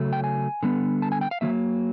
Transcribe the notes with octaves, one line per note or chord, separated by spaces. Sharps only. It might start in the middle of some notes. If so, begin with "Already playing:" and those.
Already playing: C#3 F#3 A3
G5
G#5
D3 G3 B3
A5
G#5
G5
F5
D#3 F#3 A#3 E5